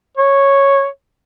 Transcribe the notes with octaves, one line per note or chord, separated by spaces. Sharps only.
C#5